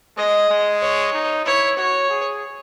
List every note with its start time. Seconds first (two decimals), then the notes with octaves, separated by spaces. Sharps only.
0.17 G#3 D#5
0.49 G#3
0.82 C#5
1.13 D#4
1.45 E4 C#5
1.77 F#4 C#5
2.10 G#4